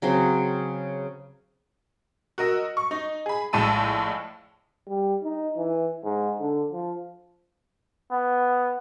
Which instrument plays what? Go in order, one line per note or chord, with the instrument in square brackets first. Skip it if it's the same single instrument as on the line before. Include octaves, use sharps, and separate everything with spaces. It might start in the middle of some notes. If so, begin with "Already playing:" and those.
[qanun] C#3 F#3 C4
[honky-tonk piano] F#4 A#4 D#5 E6
C#6
D#4
G#4 B5
A#1 A2 G#3 A5 E6 D#7
[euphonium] G3
D#4
E3
G#2
D3
F3
[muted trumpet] B3